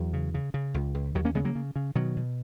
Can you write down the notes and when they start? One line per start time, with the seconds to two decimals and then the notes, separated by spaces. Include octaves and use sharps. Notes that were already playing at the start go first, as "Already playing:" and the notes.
Already playing: E2 F#3
0.13 C#3
0.34 C#3
0.54 C#3
0.74 C#2
0.95 C#2
1.15 D#2 D#3 F#3
1.25 A#3 C#4
1.35 C#3 G#3 B3
1.45 F#3 A#3
1.55 C#3
1.76 C#3
1.95 B2 D#3 F#3
2.17 B2